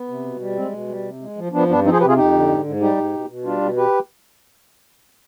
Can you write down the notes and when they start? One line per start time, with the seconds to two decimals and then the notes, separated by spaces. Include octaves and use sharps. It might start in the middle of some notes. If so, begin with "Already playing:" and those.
Already playing: B3
0.08 C3
0.25 B2
0.40 G3
0.56 G#3 C4
0.72 B2
0.88 G3
1.04 C3
1.21 G#3
1.37 F3
1.52 F3 B3 D4
1.69 G2 B3 D4
1.84 F3 C4 D#4
1.92 G#4 C5
2.00 C3 G4 B4
2.08 F4 G#4
2.17 F2 D#4 G4
2.33 D3
2.49 G#2
2.65 G#2
2.81 G3 D#4 G4
2.96 G#2
3.13 B2
3.28 B2
3.45 G3 D4 F4
3.61 B2
3.77 G4 B4